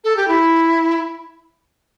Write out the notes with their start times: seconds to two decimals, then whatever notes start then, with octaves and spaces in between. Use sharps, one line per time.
0.04 A4
0.16 G4
0.28 E4